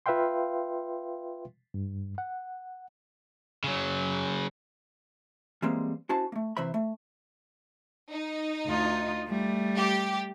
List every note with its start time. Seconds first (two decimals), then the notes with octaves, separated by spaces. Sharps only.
0.06 F4 B4 E5 F5 G5 C6
1.74 G2
2.18 F#5
3.64 C#3 F#3
5.62 E3 G3 G#3 A#3 C4
6.09 C#4 E4 F#4 C5 A5
6.32 A3 A#3
6.57 C3 E3 C5 E5 B5
6.74 A3
8.11 D#4
8.66 D2 F4
9.27 G3 A3
9.76 G4